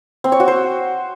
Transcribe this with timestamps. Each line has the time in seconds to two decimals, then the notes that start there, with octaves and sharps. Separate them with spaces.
0.24 C4
0.32 C#5
0.40 F#4
0.48 C5